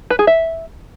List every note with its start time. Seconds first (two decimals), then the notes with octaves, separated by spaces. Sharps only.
0.10 B4
0.19 G#4
0.27 E5